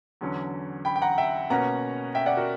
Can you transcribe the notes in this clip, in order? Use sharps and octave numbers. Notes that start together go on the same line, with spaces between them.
E2 D3 F#3 C#4
G5 B5
G5
F#5 A#5
E5 G5
B2 A#3 C#4 F#5 A#5
E5 G5
D5 F#5
F#4 A#4